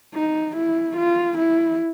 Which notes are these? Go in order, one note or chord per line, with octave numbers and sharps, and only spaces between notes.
D#4
E4
F4
E4